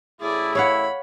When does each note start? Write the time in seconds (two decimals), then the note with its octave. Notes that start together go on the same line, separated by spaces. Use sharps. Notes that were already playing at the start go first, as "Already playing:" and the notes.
0.21 A1 A2 E4 G#4 D5
0.55 C#5 F5 F#5 B5